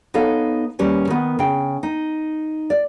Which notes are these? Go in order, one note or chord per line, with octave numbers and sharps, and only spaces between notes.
B3 D#4 A4 C#5 F5
D#2 G3 C#4 B4
D#3 B3
C#3 G5
D#4
D5